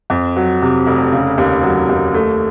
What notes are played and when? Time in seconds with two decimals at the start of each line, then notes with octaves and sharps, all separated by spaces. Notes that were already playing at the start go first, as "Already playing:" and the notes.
0.10 F2
0.36 F#3
0.62 C3
0.87 F1
1.12 C#3
1.38 D#2
1.63 F#3
1.89 D#2
2.14 A3